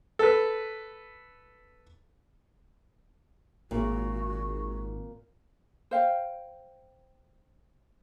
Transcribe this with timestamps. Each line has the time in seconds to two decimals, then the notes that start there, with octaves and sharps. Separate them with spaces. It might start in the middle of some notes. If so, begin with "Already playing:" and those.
0.19 A4 B4
3.71 G#1 A#2 F#4
5.91 C5 F5 G5